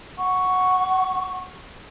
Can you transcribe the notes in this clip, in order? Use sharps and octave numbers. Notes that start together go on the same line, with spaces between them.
F#5 C#6